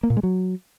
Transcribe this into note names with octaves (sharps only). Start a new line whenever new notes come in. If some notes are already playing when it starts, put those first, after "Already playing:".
A#3
A#2
G#3
F#3